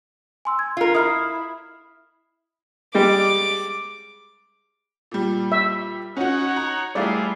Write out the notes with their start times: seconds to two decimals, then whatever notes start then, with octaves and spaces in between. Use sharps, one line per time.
0.45 G#5 C6 E6
0.59 G#6
0.77 F4 A#4
0.95 E4 D#6 F6 C7
2.95 G3 G#3 D6
5.11 A#2 G3
5.52 E5
6.17 C#4 D#4 F#4 C#5 F#5
6.56 A#5
6.95 E3 G3 A3 E4 F4 G#4 D5 F5